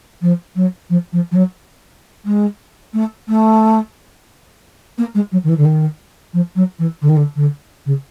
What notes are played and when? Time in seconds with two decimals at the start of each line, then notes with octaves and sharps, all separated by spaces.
0.22 F3
0.56 F#3
0.90 F3
1.12 F3
1.31 F3
1.35 F#3
2.25 G#3
2.94 A3
3.28 A3
4.98 A#3
5.15 G#3
5.32 F#3
5.44 D#3
5.49 E3
5.57 D3
5.65 D#3
6.33 F3
6.55 F#3
6.79 E3
7.01 D3
7.09 D#3
7.17 D3
7.36 D3
7.86 C#3